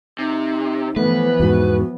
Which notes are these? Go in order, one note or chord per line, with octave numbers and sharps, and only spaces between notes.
C3 D#4
E3 F3 A3 B3 B4
E2 G#2 F#4